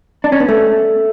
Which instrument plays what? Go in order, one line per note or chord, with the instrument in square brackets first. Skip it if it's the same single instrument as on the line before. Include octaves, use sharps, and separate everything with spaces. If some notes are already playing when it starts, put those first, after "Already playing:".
[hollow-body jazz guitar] D4
C#4
B3
A3